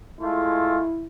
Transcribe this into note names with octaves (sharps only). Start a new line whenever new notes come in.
G#3 A3 E4 F4